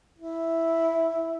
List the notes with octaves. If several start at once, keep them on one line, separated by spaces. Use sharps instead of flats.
E4